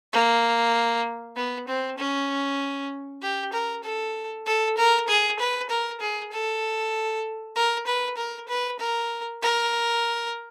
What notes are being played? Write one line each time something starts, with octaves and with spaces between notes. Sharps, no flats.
A#3
B3
C4
C#4
G4
A#4
A4
A4
A#4
G#4
B4
A#4
G#4
A4
A#4
B4
A#4
B4
A#4
A#4